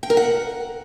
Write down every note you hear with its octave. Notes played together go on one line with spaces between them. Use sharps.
G5
A#4
F#5